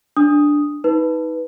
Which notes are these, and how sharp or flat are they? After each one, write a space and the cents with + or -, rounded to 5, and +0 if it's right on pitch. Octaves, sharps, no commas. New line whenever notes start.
D4 +0 D#6 +0
D#4 +30 B4 +0